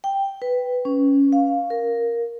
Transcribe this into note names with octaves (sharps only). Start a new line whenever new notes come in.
G5
B4
C#4
F5
A#4